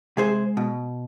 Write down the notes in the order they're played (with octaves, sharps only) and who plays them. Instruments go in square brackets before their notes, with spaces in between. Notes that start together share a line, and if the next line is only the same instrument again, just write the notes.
[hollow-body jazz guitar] C3 G#4 C5 [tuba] G#3
[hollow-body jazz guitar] B2